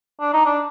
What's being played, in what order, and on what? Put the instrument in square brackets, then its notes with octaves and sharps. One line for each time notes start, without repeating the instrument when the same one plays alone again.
[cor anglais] D4
D#4
D4